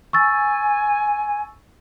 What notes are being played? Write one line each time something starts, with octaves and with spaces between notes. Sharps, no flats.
G#5 C#6 E6 A6